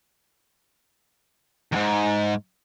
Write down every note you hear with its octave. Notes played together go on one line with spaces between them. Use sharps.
E2 G#2